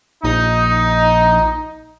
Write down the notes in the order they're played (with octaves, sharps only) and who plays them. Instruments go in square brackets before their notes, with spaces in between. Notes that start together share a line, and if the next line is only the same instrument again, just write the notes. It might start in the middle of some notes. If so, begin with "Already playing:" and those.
[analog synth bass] A#1 [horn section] D#4